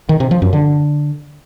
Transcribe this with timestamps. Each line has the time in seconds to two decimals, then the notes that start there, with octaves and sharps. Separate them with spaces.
0.09 D#3
0.20 C3
0.31 F3
0.42 F#2
0.53 D3